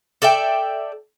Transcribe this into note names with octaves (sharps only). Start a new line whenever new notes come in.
A4 D5 E5 G5